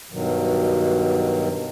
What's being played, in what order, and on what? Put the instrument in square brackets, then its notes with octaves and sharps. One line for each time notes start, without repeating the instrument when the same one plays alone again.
[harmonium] G2 B2 D#3 F#3